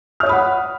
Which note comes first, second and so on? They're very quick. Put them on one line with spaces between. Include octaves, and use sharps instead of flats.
F6 C#5 D#6 B5 F#5